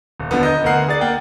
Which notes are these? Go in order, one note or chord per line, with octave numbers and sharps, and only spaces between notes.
D#1
D3 F3 B3
D#5 A#5 G6
D2 B3 A#4 F#5 C7
G#4 D5 A6
A#3 F#5 G5